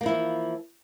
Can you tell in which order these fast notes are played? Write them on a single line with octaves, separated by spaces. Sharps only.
A#3 F3 E4 E3